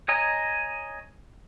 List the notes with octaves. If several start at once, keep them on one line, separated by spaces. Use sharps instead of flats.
C#5 D#5 G#5 A#5 D#6